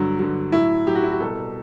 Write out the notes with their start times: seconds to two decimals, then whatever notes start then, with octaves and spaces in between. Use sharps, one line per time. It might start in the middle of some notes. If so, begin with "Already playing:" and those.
Already playing: G2 D3 F#3
0.19 G2 D3 F#3
0.52 A2 F#3 E4
0.87 A2 F#3 G4
0.95 F#4
1.03 E4
1.12 F#4
1.20 C2 B2 G3 A4